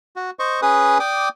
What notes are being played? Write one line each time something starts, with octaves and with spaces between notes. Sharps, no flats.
F#4
C5 D#5 C#6
C#4 G#4 B4 D#6
D5 G5 D6 D#6